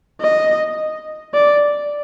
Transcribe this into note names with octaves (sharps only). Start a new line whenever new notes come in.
D#5
D5